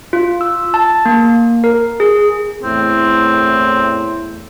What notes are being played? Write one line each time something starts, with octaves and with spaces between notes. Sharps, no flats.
F4
E6
A5
A#3
A#4
G#4
E2 A2 C4